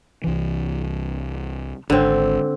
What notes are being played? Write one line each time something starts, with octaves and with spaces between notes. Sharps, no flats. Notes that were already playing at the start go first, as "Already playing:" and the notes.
C2 E3
G#1 G#2 D3 C4